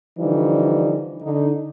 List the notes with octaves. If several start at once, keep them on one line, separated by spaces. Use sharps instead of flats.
D3 E3 F3 G3 D#4
D3 D#4